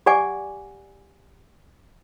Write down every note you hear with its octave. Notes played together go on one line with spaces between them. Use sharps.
G4 D5 F#5 G#5 D6